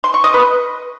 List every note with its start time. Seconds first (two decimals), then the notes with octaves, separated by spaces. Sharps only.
0.04 C6
0.14 C#6
0.24 D#5
0.34 B4